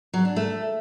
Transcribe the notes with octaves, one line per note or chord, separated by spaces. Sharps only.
F#3
D4
A3